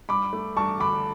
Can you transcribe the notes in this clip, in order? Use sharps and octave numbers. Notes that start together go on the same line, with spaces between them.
G2 B5 D6
A3
G2 A5 C#6
D3 B5 D6